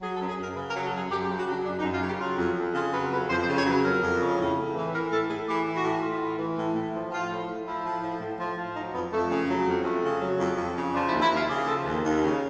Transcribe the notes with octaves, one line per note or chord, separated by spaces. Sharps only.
F#3 G#4
A4
F#2
G#4
F#2 A#4
C#3 B4
A#4
F#3
A4
F#2 G#4
F#2 G4
G4
C#3
F#4
F#3 D4
F#2 D4
D#4
F#2
F4
C#3 G4
F#3 F4
F2
F2
C#3 F4
F#3 B4
F2 B4
F2 C5
C5
C#3
C#5
F#3 B4
F2 A#4
F2
C#3
A2
A2
E3
E3 A#4
A2 A4
A2 G#4
E3 G4
E3
F#4
A2
A2 F4
E3
E3
A2
A2
F3
F3 F4
A2
A2
F3 E4
F3
A2
A2
F3
F3
F#3 D#4
F2 B3
F2 A3
C#3
F#3
F2
F2 A3
C#3
F#3
F2
F2
C#3
F3 D4
E4
D#2
E4
D#2 F4
C#3 G4
F3 A4
D#2
D#2
C#3